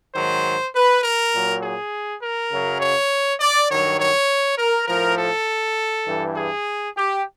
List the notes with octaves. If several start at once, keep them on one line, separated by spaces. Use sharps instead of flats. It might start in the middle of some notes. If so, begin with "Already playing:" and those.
G#2 D#3 F#3 C5
B4
A#4
A#2 F#3
G#4
A#4
F#2 C#3 F#3
C#5
D5
G2 D#3 F#3 C#5
C#5
A#4
A2 F3 A#4
A4
G2 E3
G#4
G4